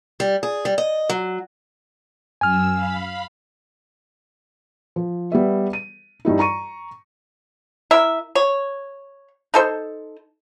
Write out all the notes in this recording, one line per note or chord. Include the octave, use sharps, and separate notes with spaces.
G3
G#4
G3
D#5
F#3
F#2 G#5 E6 F6
F5 B5
F3
G3 B3 E5
D#7
G2 G3 D#4 E4
A#5 C#6 D#7
E4 A#4 E5
C#5
D#4 A4 C5